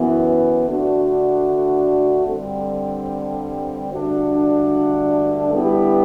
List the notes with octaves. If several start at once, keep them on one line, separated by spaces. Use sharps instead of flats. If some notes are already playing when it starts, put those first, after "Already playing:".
Already playing: F#2 E3 B3
D3 A3 D4 F#4
G2 D3 G3 C4
G2 D3 A3 D4 F#4
D3 G3 B3 E4 G4